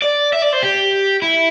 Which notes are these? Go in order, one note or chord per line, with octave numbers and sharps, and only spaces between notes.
D5
E5
D5
C5
G4
E4